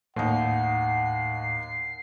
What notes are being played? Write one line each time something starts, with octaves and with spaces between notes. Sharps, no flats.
D#2 A2 D#4 F#5 C7